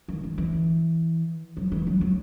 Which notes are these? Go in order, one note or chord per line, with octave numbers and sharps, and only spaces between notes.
D#3
E3
E3
F#3
E3
F#3
F#3